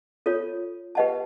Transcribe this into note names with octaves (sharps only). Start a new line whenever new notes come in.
F4 A4 C#5
G4 B4 D#5 F#5 A5